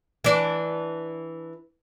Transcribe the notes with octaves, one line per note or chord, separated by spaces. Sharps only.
E3 D4